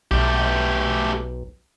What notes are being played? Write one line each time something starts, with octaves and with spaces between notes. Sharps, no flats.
B1 A3 G4